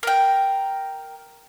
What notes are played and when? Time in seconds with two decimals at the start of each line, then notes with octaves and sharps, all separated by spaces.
0.03 A#4 G5